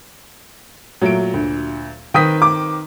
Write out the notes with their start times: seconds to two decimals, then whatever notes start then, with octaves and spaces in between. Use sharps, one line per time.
1.02 A#2 F#3 A3 D7
1.34 D2
2.14 D#3 C4 B4 G5 D#6 B6
2.42 D6